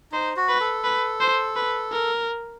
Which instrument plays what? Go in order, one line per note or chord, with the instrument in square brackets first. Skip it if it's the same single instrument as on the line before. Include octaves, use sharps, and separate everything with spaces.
[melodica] D#4 [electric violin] C5
[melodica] F#4
[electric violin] B4
[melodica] A4
[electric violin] B4
C5
B4
A#4